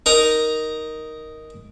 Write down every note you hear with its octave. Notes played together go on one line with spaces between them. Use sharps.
D#4 A#4 A#5